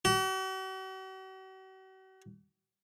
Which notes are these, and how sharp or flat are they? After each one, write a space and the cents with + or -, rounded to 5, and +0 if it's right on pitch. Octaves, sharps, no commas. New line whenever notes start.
F#4 +45